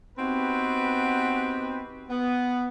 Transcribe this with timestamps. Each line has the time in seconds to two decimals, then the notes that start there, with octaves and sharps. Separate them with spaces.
0.19 B3 C4 D#4 F#4 G4 B4
2.09 B3